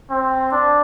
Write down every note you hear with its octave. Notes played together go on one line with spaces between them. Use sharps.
C4
D4